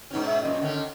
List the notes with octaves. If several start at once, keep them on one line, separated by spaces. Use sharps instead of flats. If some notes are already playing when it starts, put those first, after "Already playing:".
G#2 B2 C#4 D#4
E5
F#2 A#2 D#5
D3 D#3 C#4